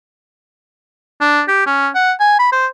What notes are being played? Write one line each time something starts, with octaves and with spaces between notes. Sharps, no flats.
D4
G4
C#4
F#5
G#5
B5
C5